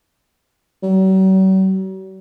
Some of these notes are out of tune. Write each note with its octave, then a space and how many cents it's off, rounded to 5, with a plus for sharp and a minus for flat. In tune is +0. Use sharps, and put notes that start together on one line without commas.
F#3 +45